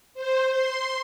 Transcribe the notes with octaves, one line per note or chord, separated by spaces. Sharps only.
C5
C6